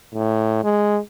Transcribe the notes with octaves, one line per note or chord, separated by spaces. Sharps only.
A2
G#3